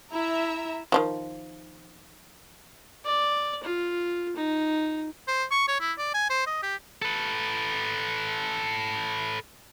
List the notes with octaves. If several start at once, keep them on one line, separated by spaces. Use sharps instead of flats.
E4 E5 A#5
D#3 F3 F#3
D5
F4
D#4
C5
C#6
C#5
E4
D5
G#5
C5
D#5
G4
A4 B4